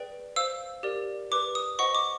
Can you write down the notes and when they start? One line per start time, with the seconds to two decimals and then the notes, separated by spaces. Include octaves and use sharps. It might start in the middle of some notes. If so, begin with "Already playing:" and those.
Already playing: G#4 B4 D5 G5
0.36 C5 F5 E6
0.83 G4 A#4 D5
1.31 G4 B4 D5 D6
1.55 D#6
1.79 C5 D#5 F#5 C#6
1.95 D6